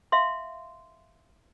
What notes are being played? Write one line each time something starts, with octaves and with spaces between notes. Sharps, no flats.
E5 F5 C6